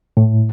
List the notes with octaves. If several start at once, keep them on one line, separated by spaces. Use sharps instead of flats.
A2